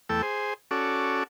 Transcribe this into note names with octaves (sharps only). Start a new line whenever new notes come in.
E2 A3 A4 G5 E6
G#4 C5
C#4 F#4 A4 D5